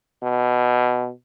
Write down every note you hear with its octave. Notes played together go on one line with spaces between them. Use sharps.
B2